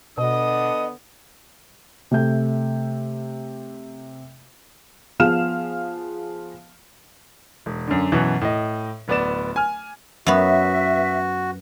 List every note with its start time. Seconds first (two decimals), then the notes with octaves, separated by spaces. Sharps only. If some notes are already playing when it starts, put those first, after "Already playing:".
0.18 B2 D3 B3 D4 D#5 D#6
2.11 C3 A3 G6
5.20 F3 B3 G#4 F5 F6 E7
7.66 E1
7.87 F#2 D3
8.12 F#2 B2 E3
8.41 A2 D#5
9.08 D1 B3 D5 E7
9.56 G#5 F6
10.27 F#2 B3 F#4 E5